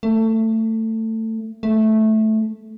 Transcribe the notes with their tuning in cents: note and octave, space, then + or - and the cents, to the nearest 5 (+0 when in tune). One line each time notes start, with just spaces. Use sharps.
A3 +20
A3 -10